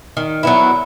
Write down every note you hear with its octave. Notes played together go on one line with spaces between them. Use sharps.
D#3
F#3 B3 E4